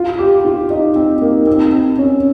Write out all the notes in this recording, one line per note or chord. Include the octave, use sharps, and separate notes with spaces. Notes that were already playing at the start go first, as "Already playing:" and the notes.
Already playing: F4
G4
F4
D#4
C4
A#3
C4
C4
C#4